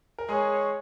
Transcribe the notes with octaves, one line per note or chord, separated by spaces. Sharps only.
A#4
G#3 G#4 C#5